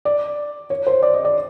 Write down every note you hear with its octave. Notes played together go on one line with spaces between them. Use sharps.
D5
C#5
C5
D5
D#5
D5